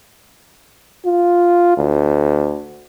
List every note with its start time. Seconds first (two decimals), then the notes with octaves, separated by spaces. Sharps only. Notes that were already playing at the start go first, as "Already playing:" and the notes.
1.05 F4
1.77 D2